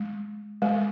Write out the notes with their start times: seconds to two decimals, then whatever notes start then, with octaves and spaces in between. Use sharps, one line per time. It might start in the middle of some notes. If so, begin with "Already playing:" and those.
Already playing: G#3
0.62 G#3